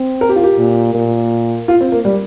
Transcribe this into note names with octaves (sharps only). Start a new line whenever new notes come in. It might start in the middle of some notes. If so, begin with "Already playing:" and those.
Already playing: C4
A#4
G4
F4
G4
A#2
A#2
F4
C4
A#3
G3